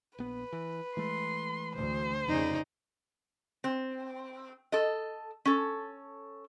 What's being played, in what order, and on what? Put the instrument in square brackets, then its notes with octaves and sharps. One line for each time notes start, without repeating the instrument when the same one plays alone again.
[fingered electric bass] A#1 B3 [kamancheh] B4
[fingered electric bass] E3
[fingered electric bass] E3 G#3 A3 [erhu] C6
[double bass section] D2 [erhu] C5
[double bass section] F1 C#3 [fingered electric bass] F2 [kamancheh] D#4 D5
[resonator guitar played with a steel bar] C4
A4 D#5
C#4 A4